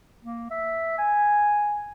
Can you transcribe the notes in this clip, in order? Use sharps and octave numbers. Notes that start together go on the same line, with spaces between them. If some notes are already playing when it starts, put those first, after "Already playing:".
A#3
E5
G#5